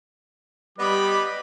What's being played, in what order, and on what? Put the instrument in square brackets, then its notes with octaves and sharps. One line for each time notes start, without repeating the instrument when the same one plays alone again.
[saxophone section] G3 [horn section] B3 D#4 B5 [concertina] B4 D5 D#5 [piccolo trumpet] D6